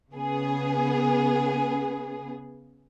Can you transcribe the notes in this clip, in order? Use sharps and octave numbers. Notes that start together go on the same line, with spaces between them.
C#3 B3 G#4